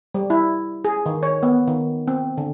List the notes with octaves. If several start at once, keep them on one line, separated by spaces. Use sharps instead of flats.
G3
E4
G#4
D#3
C#5
B3
D#3
C4
D3